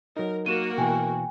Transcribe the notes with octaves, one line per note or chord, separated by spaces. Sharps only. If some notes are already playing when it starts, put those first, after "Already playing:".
F#3 D#4 A#4
A#3 F#4 A#4 D#7 E7
B2 E3 G5 G#5 C#6